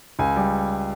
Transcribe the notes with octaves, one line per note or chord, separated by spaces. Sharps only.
C#2 G#5
G3